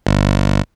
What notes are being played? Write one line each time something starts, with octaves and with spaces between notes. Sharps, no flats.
G1